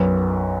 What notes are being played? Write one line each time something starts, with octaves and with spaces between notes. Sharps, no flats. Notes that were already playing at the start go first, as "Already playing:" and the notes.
Already playing: B1 F#2 B4